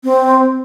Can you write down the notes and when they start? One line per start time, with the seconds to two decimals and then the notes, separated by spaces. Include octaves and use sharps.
0.04 C4